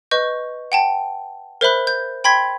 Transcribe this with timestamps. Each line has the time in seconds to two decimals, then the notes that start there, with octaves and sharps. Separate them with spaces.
0.11 B4 D#5 C#6 G6
0.72 F#5 G5 A5
1.61 A#4 C5 E5 B5 F#6
1.87 G6
2.24 G5 B5 C6 G#6 B6